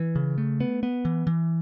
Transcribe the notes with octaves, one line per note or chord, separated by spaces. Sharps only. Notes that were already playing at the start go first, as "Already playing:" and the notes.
Already playing: E3
C#3
A3
B3
B3
E3
E3